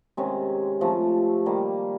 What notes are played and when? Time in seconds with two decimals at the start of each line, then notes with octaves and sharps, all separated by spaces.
0.17 C3 D#3 G#3 C#4
0.81 C3 F3 A3
1.46 D#3 G3 A#3